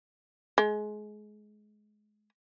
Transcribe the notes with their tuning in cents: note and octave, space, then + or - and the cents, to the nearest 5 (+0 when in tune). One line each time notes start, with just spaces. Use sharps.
G#3 +25